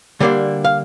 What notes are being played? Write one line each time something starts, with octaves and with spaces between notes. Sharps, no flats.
D3 G3 A#3 D4
F5